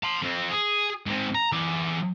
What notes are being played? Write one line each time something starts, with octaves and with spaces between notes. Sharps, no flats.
A5 C6
F2 C4
G#4
G#2 C4
A#5
E3 D5